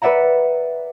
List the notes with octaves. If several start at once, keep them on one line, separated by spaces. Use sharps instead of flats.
B4 D5 E5 F#5 A#5